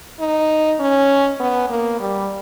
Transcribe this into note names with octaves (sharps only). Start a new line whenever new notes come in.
D#4
C#4
B3
A#3
G3